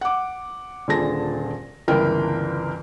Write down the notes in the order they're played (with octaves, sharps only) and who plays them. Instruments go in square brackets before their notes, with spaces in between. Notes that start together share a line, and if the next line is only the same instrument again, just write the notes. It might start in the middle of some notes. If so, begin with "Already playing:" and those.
[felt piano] F#5 D6
D#1 A#2 D3 G#4 A5 A#6
G1 C#2 E3 A#4 G5